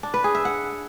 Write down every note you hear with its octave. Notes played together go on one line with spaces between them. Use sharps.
D4
B4
G#4
E5
F#5